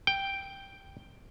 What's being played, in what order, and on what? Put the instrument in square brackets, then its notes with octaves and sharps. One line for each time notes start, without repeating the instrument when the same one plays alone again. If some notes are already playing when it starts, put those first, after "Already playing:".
[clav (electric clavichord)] G5